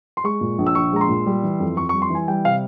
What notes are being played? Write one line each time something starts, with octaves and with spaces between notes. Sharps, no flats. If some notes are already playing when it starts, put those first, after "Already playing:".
C6
G#3 C#6
A#2
A#1
E6
A#1 C#6
G#3 A#5
C6
A#2
G3
E3
F2
F2 C#6
G3 C#6
C6
E3 G#5
G3 G5
C3 F5